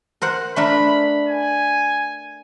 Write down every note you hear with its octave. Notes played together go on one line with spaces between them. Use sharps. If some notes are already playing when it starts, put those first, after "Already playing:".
A#4 C5 F#5
A3 D4 A#4 B5
G#5